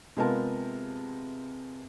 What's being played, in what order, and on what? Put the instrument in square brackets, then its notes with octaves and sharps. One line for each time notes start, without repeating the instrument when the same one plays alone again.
[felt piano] C3 G#3 B3 F4 A#4 A5